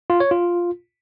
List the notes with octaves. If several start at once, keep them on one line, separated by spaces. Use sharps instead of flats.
F4
C#5
F4